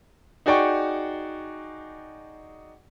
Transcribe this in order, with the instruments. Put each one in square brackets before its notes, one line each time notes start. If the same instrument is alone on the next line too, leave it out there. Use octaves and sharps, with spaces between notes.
[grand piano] D#4 F#4 G#4 D5 G5 C#6